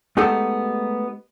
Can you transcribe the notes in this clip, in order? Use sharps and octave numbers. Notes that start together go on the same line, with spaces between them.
G#3 A3 B3 D#4 G4 A4